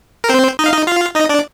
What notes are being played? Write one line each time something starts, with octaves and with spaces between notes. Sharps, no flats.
A#4
C4 C5
D#4 D#5
F5
D#4 D#5
F4 F5
D#4 D#5
D4 D5